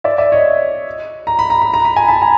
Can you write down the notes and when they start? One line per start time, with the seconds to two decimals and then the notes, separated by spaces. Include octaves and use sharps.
0.04 D5 E5
0.18 D5 E5
0.32 C#5 D#5
1.27 A#5
1.39 B5
1.50 A#5
1.62 B5
1.74 A#5
1.85 B5
1.96 G#5 A#5
2.08 A5 B5
2.22 G#5 A#5